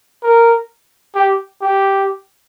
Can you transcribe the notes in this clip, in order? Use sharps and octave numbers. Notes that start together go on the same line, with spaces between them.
A#4
G4
G4